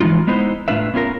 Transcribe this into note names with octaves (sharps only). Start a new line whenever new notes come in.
E3 F3 G#3 D#4 F4
G#3 B3 D#4 E4 C5
A2 D4 F4 B4 E5
B3 C#4 F4 A#4